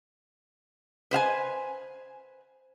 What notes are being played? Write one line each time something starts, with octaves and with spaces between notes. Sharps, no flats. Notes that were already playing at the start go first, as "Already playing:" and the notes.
B4 C5 F5 G#5